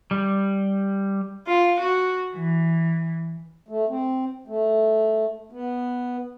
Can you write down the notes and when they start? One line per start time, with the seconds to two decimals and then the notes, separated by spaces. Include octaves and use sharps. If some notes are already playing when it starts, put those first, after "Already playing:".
0.11 G3
1.45 F4
1.78 F#4
2.35 E3
3.68 A3
3.89 C4
4.47 A3
5.52 B3